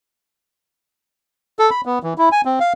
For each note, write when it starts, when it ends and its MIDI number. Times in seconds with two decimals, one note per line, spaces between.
1.59 1.70 69
1.71 1.81 83
1.86 1.99 59
2.03 2.14 52
2.18 2.29 64
2.32 2.41 80
2.45 2.59 60
2.60 2.73 77